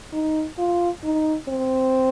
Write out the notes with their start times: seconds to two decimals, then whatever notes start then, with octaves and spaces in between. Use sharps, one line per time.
0.13 D#4
0.58 F4
1.04 D#4
1.48 C4